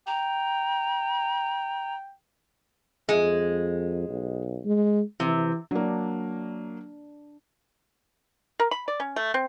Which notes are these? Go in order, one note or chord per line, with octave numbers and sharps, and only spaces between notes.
G5 A#5
F2 G#3
B1
G#3
C3 E3
F#3 A#3 D4
A#4
B5
D5
C#4
A3
C4